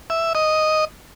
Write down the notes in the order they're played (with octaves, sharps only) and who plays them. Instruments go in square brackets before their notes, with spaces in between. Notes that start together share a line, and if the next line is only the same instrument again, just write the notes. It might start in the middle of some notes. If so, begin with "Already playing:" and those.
[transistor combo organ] E5
D#5